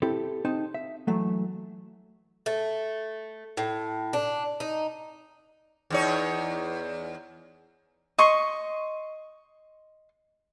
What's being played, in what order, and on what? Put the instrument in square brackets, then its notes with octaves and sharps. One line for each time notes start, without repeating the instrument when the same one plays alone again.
[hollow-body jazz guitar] C4 E4 G4 A4
C4 D#4 A5
E5
E3 F#3 A3
[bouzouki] A3
A2
D4
D#4
[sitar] E2 D#4 C#5
[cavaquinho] D#5 C6 C#6